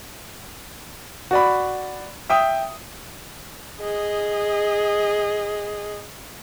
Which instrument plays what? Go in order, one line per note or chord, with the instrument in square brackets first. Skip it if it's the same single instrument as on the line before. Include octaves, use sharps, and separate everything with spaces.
[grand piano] F#4 D5 B5
E5 G5 D#6
[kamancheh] G#4 D#5